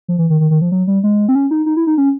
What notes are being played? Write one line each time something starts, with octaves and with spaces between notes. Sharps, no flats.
F3
E3
D#3
D#3
D#3
F3
F#3
G3
G#3
C4
C#4
D#4
D#4
E4
D#4
C#4